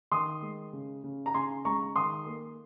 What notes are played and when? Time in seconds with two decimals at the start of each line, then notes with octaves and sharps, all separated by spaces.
0.11 D#3 C6 D#6
0.42 G#3
0.73 C#3
1.04 C#3
1.26 A#5
1.34 C#3 G#5 C6
1.65 G#3 A#5 C#6
1.96 D#3 C6 D#6
2.26 A#3